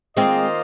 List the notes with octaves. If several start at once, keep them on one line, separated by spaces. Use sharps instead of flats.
D#3 G#3 A#3 C4 F4 C5 D#5